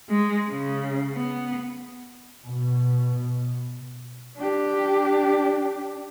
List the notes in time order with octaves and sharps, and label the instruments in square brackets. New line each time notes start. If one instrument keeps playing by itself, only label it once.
[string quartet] G#3
C#3
B3
[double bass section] B2
[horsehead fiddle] D4 G4